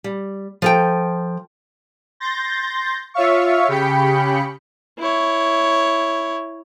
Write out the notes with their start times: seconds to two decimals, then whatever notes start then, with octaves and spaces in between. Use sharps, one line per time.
0.04 G3
0.62 F3 A4 G5
2.20 C6 G6 A6 A#6
3.14 F4 C#5 E5 F5 C#6
3.68 C#3 G4 G5 B5 C#7
4.99 E4 C#5